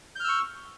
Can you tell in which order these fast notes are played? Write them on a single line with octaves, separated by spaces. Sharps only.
G6 F6 E6 C#6